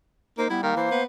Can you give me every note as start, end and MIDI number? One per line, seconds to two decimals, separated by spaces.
0.38 0.46 58
0.38 0.46 63
0.38 0.47 72
0.50 0.76 55
0.50 0.60 59
0.50 0.59 64
0.63 0.73 51
0.63 1.00 58
0.76 0.88 52
0.76 1.03 72
0.91 1.04 59